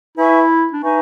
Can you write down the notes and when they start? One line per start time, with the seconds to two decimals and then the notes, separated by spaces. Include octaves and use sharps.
0.17 E4 B4 E5 G#5 C#6
0.73 D4
0.83 D#4 B4 E5 G#5 C#6